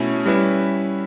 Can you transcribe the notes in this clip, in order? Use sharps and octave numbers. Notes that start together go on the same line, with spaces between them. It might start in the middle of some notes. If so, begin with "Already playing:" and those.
Already playing: B2 A3 C#4 E4
G3 C#4 E4 B4 E5